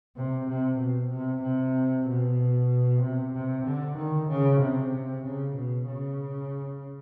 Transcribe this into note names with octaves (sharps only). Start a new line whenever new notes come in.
C3
C3
B2
C3
C3
B2
C3
C3
D3
D#3
C#3
C3
C#3
B2
C#3